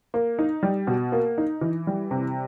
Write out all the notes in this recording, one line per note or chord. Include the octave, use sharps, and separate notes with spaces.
A#3
D#4
G3
B2
A#3
D#4
E3
G3
C3